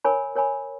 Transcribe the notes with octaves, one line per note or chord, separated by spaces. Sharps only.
A#4 C#5 G#5 B5
A#4 C#5 G#5 B5